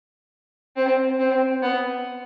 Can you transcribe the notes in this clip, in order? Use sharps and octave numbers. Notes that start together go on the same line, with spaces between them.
C4
C4
B3